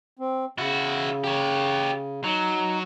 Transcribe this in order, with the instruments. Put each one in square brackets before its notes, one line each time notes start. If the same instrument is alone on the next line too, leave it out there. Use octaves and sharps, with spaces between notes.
[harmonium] C4
[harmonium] C#3 [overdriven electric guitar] E4 F#4
[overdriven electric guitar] G4 C#5
[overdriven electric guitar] F#3 [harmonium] D#4